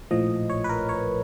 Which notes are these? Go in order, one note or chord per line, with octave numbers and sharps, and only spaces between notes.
A#1 A2 F3 D#5
C#5
B4
A#4
C#5